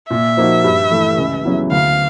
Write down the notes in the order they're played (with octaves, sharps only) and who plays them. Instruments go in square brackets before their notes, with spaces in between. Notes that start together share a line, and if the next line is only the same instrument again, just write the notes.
[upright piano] A#2 [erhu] E5
[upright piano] F3 A#3 D#4 F#4
G2
E3 A3
C#2
C#3 F#3 B3 E4
[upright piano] D2 [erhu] F5